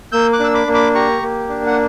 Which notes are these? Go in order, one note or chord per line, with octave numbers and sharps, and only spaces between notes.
A#3 E6 G6
D6 F#6
D4 E6
B5 D6
A#3
B5 D6
G4 A#5 C#6
A#3
D4
F#5